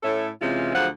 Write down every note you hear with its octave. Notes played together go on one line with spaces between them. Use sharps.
A2 C#4 A4 E5
C3 E3 G#3 C#4 F4
D2 F3 F#3 G#4 F#5